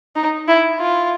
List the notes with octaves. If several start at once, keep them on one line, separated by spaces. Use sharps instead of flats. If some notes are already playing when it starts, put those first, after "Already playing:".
D#4
E4
F4